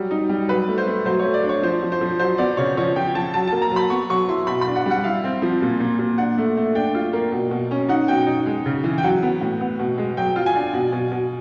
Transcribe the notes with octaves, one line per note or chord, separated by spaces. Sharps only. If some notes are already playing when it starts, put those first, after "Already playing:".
Already playing: F#3 G3
D#4
G3
F#3 B4
A3
C5
A3
F#3 C5
C#5
A3
D5
D4
C#5
F3 C5
F3
C5
F3
F#3 C5
B3 D5
C#3 C#5
F3 C#5
F3 G5
F3 A5
F#3 A5
A#3 A5
A#5
F#3
B5
B3 C#6
F#3 C#6
E4 C6
B2 B5
B5
D4
F#5
G3
F#5
E4 F5
C4
F3
A#2
A#2
A#2
D4 F#5
A3
A3
D4 G5
F4
A#3
B2
B2
C#4
D#4 F#5
B2 G5
D#4
G#3
C#3
E3
G5
F#3 F#5
B3
A2
B3
B2
G#3
F#3 G5
F4
G#5
D4
B2
B2
B2